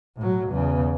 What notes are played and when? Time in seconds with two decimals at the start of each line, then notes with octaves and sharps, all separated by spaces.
0.17 A2 F#3
0.50 E2 C#3